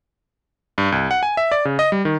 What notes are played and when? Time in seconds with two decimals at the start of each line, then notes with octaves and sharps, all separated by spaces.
0.78 G2
0.92 C2
1.11 F#5
1.23 G#5
1.37 E5
1.52 D5
1.65 C#3
1.79 D#5
1.92 G3
2.05 D#3